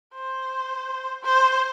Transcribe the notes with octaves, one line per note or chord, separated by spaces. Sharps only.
C5
C5